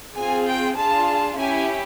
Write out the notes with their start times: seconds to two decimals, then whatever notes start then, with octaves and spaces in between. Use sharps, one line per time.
0.16 C4 F4 G#4 G#5
0.47 G5
0.77 D4 F4 G#4 A5
1.37 C#4 E4 G4 G#5